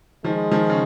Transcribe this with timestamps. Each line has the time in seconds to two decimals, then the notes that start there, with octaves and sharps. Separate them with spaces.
0.24 D#3 F3 G#3
0.51 D#3 F3
0.70 C#3